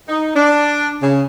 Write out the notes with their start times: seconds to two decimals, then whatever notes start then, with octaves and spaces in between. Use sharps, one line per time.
0.07 D#4
0.35 D4
1.01 C#3